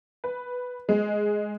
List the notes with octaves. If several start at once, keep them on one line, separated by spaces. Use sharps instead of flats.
B4
G#3